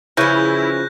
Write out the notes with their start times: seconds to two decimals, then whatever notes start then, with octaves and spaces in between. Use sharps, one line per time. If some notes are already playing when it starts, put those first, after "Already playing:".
0.17 C#3 E3 F3 C#4 E4 F#6 G6 A#6